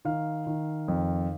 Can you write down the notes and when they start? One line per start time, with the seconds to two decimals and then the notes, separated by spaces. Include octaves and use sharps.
0.05 D#3 F5
0.47 D#3
0.88 F2